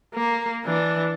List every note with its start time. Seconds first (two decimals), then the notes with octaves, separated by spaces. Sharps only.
0.14 A#3
0.65 E3 D4